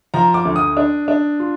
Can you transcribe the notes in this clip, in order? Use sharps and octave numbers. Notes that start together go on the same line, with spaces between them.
F3 A#5
D6
D2
D#6
D4
D4
F4